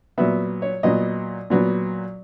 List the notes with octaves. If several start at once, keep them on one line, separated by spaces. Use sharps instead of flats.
A#2 F#3 B3 E5
C#5
A#2 F#3 B3 D#5
A#2 F#3 B3